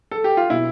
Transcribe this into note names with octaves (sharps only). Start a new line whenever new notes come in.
A4
G4
F4
B2 E4